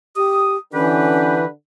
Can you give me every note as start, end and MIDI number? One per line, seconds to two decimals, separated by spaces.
0.16 0.57 67
0.16 0.56 87
0.73 1.52 50
0.73 1.45 52
0.73 1.37 61
0.73 1.46 67
0.73 1.46 71